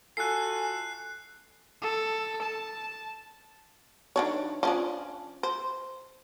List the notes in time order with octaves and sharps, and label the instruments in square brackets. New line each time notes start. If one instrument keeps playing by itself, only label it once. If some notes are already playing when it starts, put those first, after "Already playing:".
[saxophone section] F4 F#4 A4 [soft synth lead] G#5 [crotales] F#6 C7
[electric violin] A4
A5
[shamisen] D#3 D4 C#5
F3 C#4 D4
C5